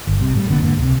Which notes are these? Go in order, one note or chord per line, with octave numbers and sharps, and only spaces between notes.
G1
C2 C3
A2 G3
F1 D3 A#3 B3
E2 G#2 D3 A#3
C#2 C3